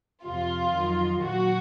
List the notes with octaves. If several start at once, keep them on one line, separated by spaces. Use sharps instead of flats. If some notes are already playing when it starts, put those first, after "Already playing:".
F2 C3 F3 F4
F2 D#3 F#3
A#2 F#3 F#4